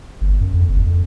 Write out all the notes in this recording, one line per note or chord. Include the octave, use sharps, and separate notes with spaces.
G1
F#2
F2
F#1
F2